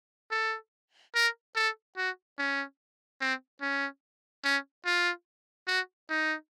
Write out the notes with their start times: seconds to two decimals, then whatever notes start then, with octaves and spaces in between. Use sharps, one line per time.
0.31 A4
1.15 A#4
1.56 A4
1.97 F#4
2.39 C#4
3.21 C4
3.61 C#4
4.45 C#4
4.86 F4
5.68 F#4
6.10 D#4